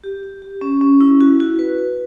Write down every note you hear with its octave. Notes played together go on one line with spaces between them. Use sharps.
G4
G4
G4
C#4
C#4
E4
F#4
F#4
B4
B4